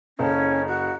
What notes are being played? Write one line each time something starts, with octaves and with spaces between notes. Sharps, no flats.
F#1 C#3 C#4 A4
F#4